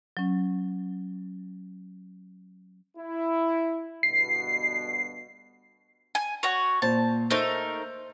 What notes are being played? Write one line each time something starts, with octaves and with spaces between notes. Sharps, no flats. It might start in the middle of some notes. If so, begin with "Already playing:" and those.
F#3 C#4
E4
D2 G2 B2 C7
G#5
F#4 C#5
A#2 C5 A5
A3 D#4 A#4 C5